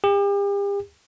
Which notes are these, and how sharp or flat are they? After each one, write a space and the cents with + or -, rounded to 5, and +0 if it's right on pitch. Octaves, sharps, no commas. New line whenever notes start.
G4 +40